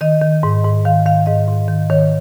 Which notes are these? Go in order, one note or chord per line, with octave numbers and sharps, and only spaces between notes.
D#3 D#5
D#3
G#2
G#2
D#3 F5
D#3 F5
G#2 D#5
G#2
D#3
D#3 C#5